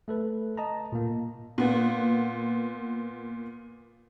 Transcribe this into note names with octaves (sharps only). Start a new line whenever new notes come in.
A3 A4 B4
D#5 A5 A#5
A#2 A#3
A#2 B3